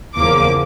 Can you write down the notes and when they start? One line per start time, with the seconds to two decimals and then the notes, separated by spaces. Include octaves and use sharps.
0.16 E2 C#3 F3 A#3 D6